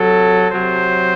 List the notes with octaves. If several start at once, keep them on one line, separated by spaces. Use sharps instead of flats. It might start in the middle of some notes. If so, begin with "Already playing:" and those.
Already playing: C3 F#3 A4
C3 F#3 C5